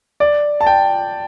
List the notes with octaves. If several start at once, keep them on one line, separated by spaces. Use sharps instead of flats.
D5
A5
G5